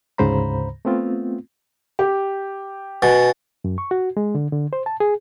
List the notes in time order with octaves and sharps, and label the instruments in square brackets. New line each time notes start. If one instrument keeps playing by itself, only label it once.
[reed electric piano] D2 G#2 C#3 C5 A#5 B5
A3 B3 C4 F4
[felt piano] G4
[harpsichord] B2 [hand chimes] F#5 G#5 A6
[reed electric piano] F#2
C#6
F#4
G#3
D3
D3
C5
A5
G#4